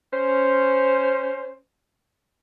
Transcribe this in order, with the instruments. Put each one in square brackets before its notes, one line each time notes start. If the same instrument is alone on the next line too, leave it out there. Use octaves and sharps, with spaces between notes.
[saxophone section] C#4 C5